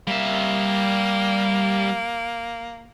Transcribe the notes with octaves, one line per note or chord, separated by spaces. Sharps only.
G3 A#3 E5